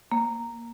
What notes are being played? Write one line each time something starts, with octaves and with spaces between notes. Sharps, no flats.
A#3